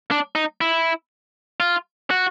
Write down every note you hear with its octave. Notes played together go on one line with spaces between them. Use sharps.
D4
D#4
E4
F4
F#4